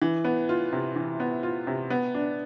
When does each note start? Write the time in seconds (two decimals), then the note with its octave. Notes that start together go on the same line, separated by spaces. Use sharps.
0.02 E3
0.24 B3
0.49 F4
0.73 C3
0.96 E3
1.20 B3
1.43 F4
1.67 C3
1.90 B3
2.14 D4